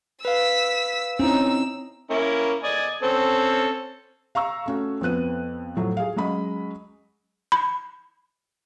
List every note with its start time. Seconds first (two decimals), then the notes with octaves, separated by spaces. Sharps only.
0.25 B4 F5 E6 B6
1.19 C4 C#4 D#4 E4 C5 E6
2.10 A#3 C#4 E4
2.64 D5 D#5 G#5
3.03 C4 C#4 A4
4.35 F5 A#5 C#6 E6
4.66 A3 C#4 F#4
5.01 F2 F3 B3 F#6 D#7
5.76 A2 F3 F#3
5.97 G#4 F5
6.16 F#3 G#3 C#4 D#5 B5
7.52 B5